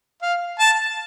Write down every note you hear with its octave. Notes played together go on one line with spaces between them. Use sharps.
F5
A5